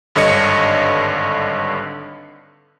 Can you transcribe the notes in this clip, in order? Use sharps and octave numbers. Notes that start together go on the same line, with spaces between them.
G#1 G2 D3 C#5 D#5 C#7